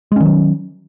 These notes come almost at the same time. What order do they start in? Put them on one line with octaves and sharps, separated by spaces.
G#3 C#4 D#3 F#3